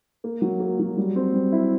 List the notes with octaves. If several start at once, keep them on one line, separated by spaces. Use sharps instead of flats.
A#3
F#3
A#3
F#3
G3
C4
G3
E4